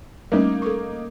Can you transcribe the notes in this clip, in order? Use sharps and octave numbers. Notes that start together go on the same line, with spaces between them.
G3 A3 A#3 C#4 D#4
A4 C#6